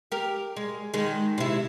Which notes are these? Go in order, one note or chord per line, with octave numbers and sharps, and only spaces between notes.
G4 A#4
G#3
D#3 G#3
C3 E4